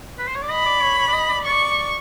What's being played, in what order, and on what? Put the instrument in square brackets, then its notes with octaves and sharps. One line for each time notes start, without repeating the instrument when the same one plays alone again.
[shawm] B4
C5
C#5
D5
[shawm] D#5 [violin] B5
[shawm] D5
C#5
C#5
D5
D#5
D5
[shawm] D5 [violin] C#6